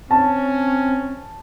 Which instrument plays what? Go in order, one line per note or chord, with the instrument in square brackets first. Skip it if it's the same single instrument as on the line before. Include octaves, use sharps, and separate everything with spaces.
[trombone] C4 [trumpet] C#4 [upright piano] A5